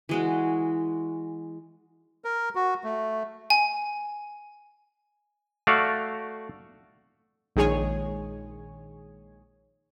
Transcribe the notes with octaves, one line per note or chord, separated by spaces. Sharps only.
E3 G#3 F#4
A#4
F#4
A3
G#5
A3 F#4 D5 F5
A#1 D#3 G#3 G#4 C#5 G#5